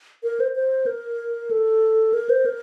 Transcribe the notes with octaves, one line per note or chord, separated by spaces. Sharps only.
A#4
C5
C5
A#4
A4
A#4
C5
A#4